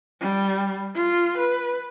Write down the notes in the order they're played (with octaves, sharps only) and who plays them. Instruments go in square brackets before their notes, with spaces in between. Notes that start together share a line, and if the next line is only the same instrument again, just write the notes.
[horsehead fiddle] G3
F4
B4